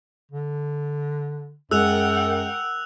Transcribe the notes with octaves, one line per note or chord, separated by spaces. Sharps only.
D3
F#2 G#3 A#4 F#5 G5 E6 F#6 F7